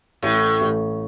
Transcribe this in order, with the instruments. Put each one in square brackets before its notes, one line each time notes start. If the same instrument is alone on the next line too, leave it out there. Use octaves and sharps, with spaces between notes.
[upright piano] A1 [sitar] A2
[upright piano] A1